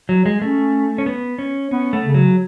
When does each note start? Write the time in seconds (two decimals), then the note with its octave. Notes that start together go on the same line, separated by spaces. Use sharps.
0.09 F#3
0.26 G#3
0.42 A3 C#4
0.98 C#4
1.06 B3
1.38 C#4
1.71 B3 C#4
1.93 A3
2.03 C#3
2.14 F#3